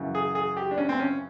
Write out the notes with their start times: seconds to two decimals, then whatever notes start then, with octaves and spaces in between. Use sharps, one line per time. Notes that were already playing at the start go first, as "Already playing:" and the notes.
Already playing: F#2 C#3 E3
0.15 G#4
0.35 G#4
0.57 G4
0.71 D4
0.78 C#4
0.89 C4
1.00 C#4